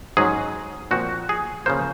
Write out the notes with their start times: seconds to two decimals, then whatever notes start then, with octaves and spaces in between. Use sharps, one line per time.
0.17 G#2 F#3 C#4 G#4
0.91 A#2 F3 C4 F#4
1.29 G#4
1.66 C#3 F3 A#3 C5